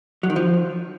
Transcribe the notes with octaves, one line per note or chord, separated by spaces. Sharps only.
F#3
D#3
F3